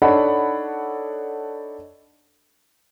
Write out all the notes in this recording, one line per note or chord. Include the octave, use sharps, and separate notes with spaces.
D4 D#4 A4 C#5 F#5 B5